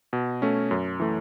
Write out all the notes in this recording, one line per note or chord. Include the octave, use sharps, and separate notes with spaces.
B2
A3 C#4
F#2
E3 A3